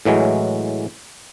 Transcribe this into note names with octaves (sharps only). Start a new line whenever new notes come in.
A2 E3 F#3 G#3